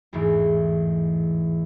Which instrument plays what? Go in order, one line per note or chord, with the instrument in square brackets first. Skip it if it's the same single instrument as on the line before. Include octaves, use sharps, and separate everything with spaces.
[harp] A1 E2 G#2 E3